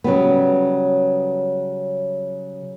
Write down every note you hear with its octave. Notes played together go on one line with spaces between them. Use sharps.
C#3 F#3 G3 B3